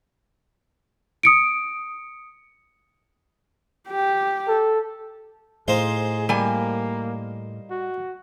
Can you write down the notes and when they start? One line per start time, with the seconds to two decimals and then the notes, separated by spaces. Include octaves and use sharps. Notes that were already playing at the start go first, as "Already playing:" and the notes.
1.23 D#6 C#7 D7
3.89 G4
4.48 A4
5.68 A2 D#4 G#4 C5 F5
6.29 G3 A#3 G#5
7.71 F#4